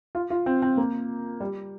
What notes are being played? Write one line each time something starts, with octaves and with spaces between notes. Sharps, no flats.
F4
F4
C4
C4
A#3
G3